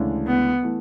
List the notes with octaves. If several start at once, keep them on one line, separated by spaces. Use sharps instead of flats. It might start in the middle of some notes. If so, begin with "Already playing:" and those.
Already playing: D2 C#3 E3 G#3 D4
B3
E3 A3